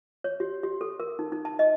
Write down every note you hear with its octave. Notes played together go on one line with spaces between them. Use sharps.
C#5
G4
G4
A4
A#4
D#4
D#4
A5
D#5